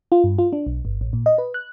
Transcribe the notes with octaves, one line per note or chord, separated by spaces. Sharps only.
F4
G2
F4
D4
B1
G1
A1
A#2
D#5
B4
F#6